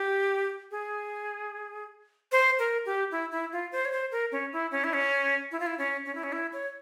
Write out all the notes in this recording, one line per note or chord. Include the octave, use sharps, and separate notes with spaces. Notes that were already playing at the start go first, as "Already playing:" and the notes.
Already playing: G4
G#4
C5
A#4
G4
E4
E4
F4
C5
C#5
C5
A#4
C#4
E4
C#4
E4
C#4
E4
F4
E4
C#4
C#4
E4
C#4
E4
C#5